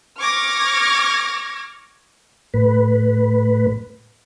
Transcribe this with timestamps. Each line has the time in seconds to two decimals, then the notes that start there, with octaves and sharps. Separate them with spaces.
0.18 C#6 D6 F6 G#6 A#6
2.54 A2 B4